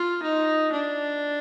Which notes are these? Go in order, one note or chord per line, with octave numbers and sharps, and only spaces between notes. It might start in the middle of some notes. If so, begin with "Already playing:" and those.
Already playing: F4
D#4
D4